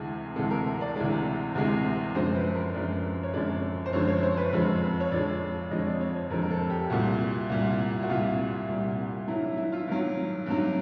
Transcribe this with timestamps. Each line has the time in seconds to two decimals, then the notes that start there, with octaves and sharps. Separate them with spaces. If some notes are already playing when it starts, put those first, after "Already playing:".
Already playing: D2 C3 E3 G#3 G#4
0.36 D2 C3 E3 G#3 A4
0.51 A#4
0.81 D5
0.96 D2 C3 E3 G#3 D5
1.55 D2 C3 E3 G#3
2.14 F#2 D3 F3 G#3 C5
2.35 B4
2.55 A#4
2.74 F#2 D3 F3 G#3 D5
3.23 C#5
3.34 F#2 D3 F3 G#3 D5
3.86 C5
3.93 F#2 D3 F3 G#3 C#5
4.08 C#5
4.23 C5
4.37 B4
4.53 F2 D3 F3 G#3
5.00 C#5
5.12 F2 D3 F3 G#3 D5
5.71 F2 D3 F3 G#3 D#5
5.79 C#5
5.86 D5
6.01 C#5
6.16 C5
6.30 F2 D3 F3 G#3 A#4
6.43 A#4
6.50 A4
6.70 G4
6.90 C2 A#2 G3 F#4
7.49 C2 A#2 G3
8.03 F#4
8.09 C2 A#2 G3 F4
8.68 C2 A#2 G3
9.28 G2 D#3 F#3 E4
9.57 E4
9.72 F4
9.87 G2 D#3 F#3
10.46 G2 D#3 F#3